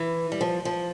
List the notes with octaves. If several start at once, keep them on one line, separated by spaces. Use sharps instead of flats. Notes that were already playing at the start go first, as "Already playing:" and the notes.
Already playing: E3
G3
F3
F3